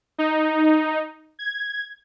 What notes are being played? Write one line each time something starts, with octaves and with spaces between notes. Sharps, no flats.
D#4
G#6